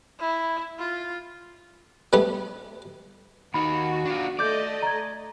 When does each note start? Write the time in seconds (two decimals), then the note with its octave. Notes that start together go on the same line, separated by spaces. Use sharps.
0.19 E4
0.79 F4
2.13 G3 A3 B3
3.54 D#2 D#4 F#4 B5
4.06 D4 F4
4.39 A3 D5 D#5 D6 G6
4.83 A#5 G#6